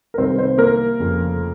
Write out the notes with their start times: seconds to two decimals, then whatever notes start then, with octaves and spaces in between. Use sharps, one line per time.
0.14 A#4
0.18 C2 C3 D#3 C4 C5
0.39 C4 C5
0.58 A#3 A#4
0.99 F1 F2 C#3